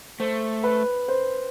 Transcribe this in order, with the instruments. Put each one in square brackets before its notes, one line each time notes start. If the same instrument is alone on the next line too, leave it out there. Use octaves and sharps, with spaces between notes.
[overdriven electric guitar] A3 [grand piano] C5
[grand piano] B4
C5